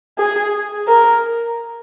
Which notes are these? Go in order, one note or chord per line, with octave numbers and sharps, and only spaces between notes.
G#4
A#4